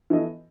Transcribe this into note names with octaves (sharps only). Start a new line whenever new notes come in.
E3 B3 F#4 A4 D#5